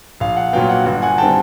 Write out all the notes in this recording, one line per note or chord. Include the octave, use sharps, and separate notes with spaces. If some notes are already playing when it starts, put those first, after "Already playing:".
A#1 F5
F#5
A#2 F#3 B3 F5 G5
F#5
G1 F#5
F#5 G#5
D#3 G3 C4 G5 A5